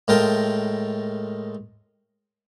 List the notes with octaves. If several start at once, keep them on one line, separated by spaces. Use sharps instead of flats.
A2 G#3 F4 A#4 G5 A5